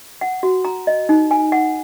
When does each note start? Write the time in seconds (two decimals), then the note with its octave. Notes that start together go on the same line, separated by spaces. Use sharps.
0.21 F#5
0.43 F#4
0.65 A#5
0.87 D#5
1.09 D#4
1.31 G#5
1.52 F#5